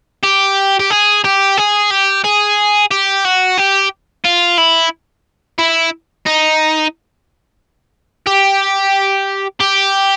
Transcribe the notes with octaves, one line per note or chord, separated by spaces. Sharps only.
G4
G4
G#4
G4
G#4
G4
G#4
G4
F#4
G4
F4
E4
E4
D#4
G4
G4